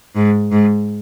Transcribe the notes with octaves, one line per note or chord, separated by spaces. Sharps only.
G#2
G#2